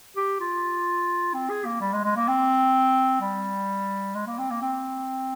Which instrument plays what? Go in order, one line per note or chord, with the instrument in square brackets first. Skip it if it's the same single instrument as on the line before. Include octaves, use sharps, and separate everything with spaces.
[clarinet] G4
F4
C4
G#4
A#3
G3
G#3
G#3
A#3
C4
G3
G#3
A#3
C4
A#3
C4